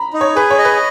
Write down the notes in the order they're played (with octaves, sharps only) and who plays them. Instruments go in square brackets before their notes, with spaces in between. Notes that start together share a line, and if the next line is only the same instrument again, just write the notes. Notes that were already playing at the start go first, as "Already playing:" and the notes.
Already playing: [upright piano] A#5 B5
[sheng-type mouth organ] D#4
[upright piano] C#5
[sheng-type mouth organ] G#4 [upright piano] B4
[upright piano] C#5
[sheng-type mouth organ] D#5
[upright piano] B4